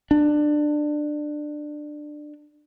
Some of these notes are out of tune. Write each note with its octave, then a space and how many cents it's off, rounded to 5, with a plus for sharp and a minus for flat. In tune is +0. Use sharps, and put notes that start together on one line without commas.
D4 +20